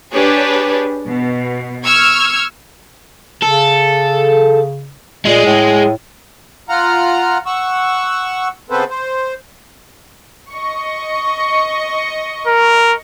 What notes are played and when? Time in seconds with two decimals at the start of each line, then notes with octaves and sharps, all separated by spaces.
0.12 D4 G4 G#4 B4 C#5
1.07 B2
1.85 C#6 E6 F6 G#6
3.42 C#3 A4
5.25 A#2 G#3 G#4
5.45 A2
6.69 F4 F#5 A#5 F6
7.46 F#5 C#6 E6
8.70 C#3 B3 C4 A4 B4 C5
8.90 C5
10.51 D#5 C#6
12.47 A#4